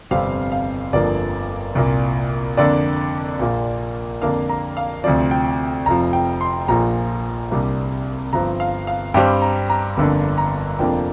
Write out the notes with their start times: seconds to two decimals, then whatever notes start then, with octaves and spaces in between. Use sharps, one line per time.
0.11 G1 F2 C3 G3 C4 F5
0.52 F5
0.93 G1 F2 D3 F3 A#3 D5
1.75 C2 A#2 A#3
2.57 F2 D3 A#3 D4 D5
3.39 A#1 A#2 A#3
4.22 F2 D3 A#3 D4 F5
4.49 A#5
4.77 F5
5.04 D2 C3 F3 D5
5.31 G5
5.86 F1 F2 F3 A#5
6.13 G5
6.41 C6
6.68 A#1 A#2 F3 A#5
7.51 C2 C3 G3 A#3 D4
8.32 G1 G2 F3 C4 A#5
8.60 F5
8.87 F5
9.14 G2 G3 C4 G5
9.42 A#5
9.70 A#5
9.97 G1 F2 D3 A#3 D4
10.38 A#5
10.79 F1 F2 F3 A#3 D4 G5